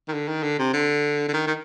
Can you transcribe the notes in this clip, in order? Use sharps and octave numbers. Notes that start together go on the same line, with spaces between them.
D#3
D3
D#3
D3
C3
D3
D3
D#3
D#3